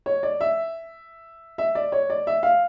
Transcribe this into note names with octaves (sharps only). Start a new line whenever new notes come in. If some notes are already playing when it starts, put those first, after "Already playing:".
C#5
D5
E5
E5
D5
C#5
D5
E5
F5